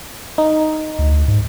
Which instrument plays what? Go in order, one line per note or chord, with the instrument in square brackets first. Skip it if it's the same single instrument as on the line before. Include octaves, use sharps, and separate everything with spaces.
[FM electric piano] D#4
[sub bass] D2
G#2